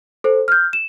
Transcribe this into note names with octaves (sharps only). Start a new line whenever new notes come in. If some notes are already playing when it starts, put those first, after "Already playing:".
A4 C5
F6 G6
E7